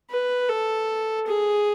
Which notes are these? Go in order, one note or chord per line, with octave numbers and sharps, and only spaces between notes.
B4
A4
G#4